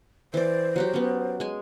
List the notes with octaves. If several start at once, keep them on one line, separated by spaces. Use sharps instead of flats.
E3 C5 D5
F#3 F#4 G4
B3 C#4
G#3 G#5